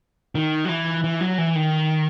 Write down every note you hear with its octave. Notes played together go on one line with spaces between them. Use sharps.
D#3
F#3
E3
E3
F#3
E3
D#3